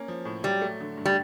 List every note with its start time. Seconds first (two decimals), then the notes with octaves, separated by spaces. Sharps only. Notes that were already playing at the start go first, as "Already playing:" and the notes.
Already playing: A#3 C#4
0.08 F3
0.25 A2
0.44 F#3 G3
0.61 A3
0.81 D3
0.97 G2
1.06 G3